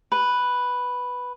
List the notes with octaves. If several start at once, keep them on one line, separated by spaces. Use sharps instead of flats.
B4